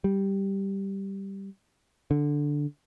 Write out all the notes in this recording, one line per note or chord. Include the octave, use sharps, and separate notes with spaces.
G3
D3